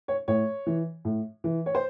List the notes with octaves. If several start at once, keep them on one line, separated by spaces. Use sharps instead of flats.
C#5
A2 C#5
E3
A2
E3
C#5
C5